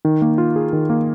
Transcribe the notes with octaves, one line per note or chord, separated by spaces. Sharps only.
D#3
A#3
F4
G#4
D#3
A#3